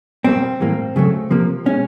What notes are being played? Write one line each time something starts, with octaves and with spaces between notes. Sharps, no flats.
B2 G3 A#3 C4
A2 E3 G3 A#3
C#3 F#3 A3
C3 F3 A#3
B2 G#3 C#4